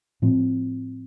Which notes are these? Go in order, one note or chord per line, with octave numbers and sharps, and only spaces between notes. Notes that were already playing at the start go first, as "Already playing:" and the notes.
A2 F3 C4